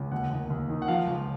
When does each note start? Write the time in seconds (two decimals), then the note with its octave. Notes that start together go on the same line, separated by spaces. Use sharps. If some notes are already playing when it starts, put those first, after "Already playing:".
Already playing: C#2
0.12 D#2 F#5
0.31 D#2
0.50 D#2
0.69 D#3
0.82 F#5
0.88 F3 F5
1.07 C#2